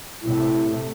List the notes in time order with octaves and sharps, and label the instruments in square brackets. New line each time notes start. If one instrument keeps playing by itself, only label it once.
[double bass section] A2 C3 A3 [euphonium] E4